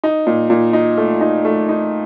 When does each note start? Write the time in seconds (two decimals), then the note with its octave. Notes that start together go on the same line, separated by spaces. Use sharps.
0.04 D#4
0.27 A#2
0.50 A#2
0.73 D#4
0.97 A3
1.21 D#4
1.45 A3
1.69 D#4